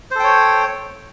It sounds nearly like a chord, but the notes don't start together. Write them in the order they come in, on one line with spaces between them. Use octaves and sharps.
C5 A4 G5 C#5